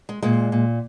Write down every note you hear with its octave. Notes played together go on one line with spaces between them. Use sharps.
G#3
A#2 G#3
A#2